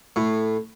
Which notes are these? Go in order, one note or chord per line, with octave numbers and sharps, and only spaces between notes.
A2